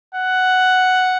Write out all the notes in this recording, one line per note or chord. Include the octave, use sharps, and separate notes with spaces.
F#5